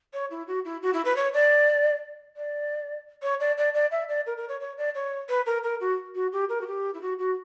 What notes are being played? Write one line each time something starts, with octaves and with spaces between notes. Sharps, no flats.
C#5
E4
F#4
E4
F#4
E4
B4
C#5
D5
D5
C#5
D5
D5
D5
E5
D5
A#4
A#4
C#5
C#5
D5
C#5
B4
A#4
A#4
F#4
F#4
G4
A#4
F#4
G4
E4
F#4
F#4